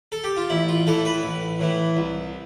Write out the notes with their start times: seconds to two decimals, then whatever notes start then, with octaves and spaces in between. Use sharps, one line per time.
0.12 A4
0.24 G4
0.37 F4
0.50 A1 E4
0.68 F4
0.86 A2 E3 A4
1.05 B4
1.23 A1
1.59 A2 E3
1.97 C2